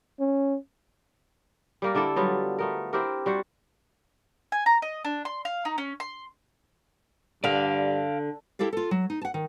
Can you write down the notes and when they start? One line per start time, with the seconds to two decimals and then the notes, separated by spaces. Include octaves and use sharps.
0.20 C#4
1.82 G3 A#3 A#4
1.95 D3 D4 E4 A4
2.16 F#3 G3 B3 F4
2.59 A3 B3 A#4
2.93 C4 E4 G4 A#4
3.26 G3 F#4 C5 F#5
4.52 G#5
4.66 A#5
4.82 D#5
5.05 D4
5.25 C6
5.45 F5
5.65 D#4
5.78 C#4
6.00 C6
7.44 G2 D3 D5 F5
8.59 E4 G4 A4 D5 F5
8.73 F4 A4
8.91 F#3
9.10 D#4
9.21 F#5 A5
9.34 D#3